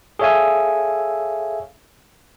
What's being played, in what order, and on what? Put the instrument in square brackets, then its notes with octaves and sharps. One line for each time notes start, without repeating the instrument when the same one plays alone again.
[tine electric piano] G#4 A4 C#5 E5 F5 G#5